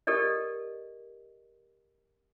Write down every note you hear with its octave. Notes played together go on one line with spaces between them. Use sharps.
G4 A4 A#4 D5 D#5